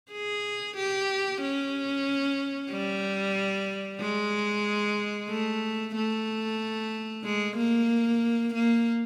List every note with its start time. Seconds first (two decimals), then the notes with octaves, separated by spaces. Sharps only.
0.12 G#4
0.77 G4
1.42 C#4
2.71 G3
4.00 G#3
5.30 A3
5.96 A3
7.24 G#3
7.57 A#3
8.55 A#3